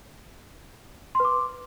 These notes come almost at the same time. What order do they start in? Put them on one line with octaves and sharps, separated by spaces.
C6 B4 D6